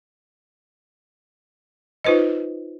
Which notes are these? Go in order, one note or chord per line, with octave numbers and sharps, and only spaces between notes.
D#4 F4 B4 C5 D#5